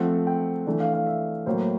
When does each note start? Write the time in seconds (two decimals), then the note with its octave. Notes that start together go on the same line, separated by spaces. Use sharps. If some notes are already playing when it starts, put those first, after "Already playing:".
Already playing: F3 A3 C4 F#5
0.27 G5
0.67 E3 A3 D4
0.80 F5
0.94 F5
1.06 E5
1.46 A2 F#3 A#3 C5